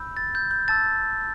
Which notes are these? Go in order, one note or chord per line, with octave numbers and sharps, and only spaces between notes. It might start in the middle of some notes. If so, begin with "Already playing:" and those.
Already playing: B5 E6 G6
A6
G6
G6
A5 E6 G6 A6